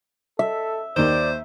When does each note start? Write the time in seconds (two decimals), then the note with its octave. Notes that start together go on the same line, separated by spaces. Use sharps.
0.39 A4 E5
0.96 D#2 D#3 C5 D5